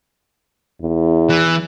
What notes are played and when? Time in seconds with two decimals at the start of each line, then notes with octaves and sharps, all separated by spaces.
0.81 E2
1.29 E3